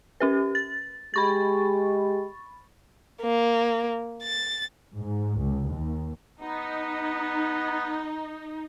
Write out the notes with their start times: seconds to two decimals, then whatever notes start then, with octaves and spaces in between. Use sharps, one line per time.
0.20 C#4 G4 B4
0.55 A6
1.14 G#3 G4 B5 C#6 A6
3.22 A#3
4.23 A6
4.96 G#2
5.41 C#2
5.71 D#2
6.42 B3 D#4